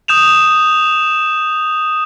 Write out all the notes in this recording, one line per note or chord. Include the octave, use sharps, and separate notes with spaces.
D#6 G6 E7 F7